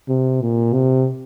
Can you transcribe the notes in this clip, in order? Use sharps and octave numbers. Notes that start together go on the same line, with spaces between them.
C3
A#2
C3